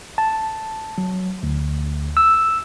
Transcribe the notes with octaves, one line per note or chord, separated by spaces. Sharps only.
A5
F#3
D2
E6